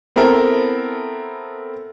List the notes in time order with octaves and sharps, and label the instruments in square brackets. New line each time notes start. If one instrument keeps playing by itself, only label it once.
[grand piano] B3 C4 E4 A4 A#4